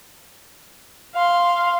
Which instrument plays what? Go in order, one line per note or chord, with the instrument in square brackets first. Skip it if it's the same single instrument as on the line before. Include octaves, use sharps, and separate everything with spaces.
[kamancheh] F5 C6